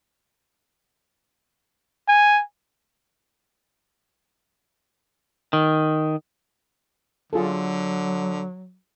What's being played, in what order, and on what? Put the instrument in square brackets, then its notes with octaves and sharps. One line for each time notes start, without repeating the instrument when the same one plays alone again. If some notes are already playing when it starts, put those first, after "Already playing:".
[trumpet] G#5
[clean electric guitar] D#3
[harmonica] D3 [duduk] F#3 [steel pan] F4 G#4 A4